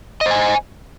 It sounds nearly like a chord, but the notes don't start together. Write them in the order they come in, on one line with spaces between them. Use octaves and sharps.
D#5 C5 G#5